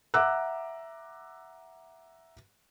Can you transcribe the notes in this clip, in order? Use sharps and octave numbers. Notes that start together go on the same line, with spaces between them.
E5 F#5 A#5 D6 E6 F#6